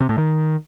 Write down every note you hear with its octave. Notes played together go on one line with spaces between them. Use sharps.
C3
A2
D#3